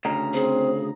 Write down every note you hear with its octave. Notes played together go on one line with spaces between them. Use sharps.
D2 C#3 A#5
C4 G#4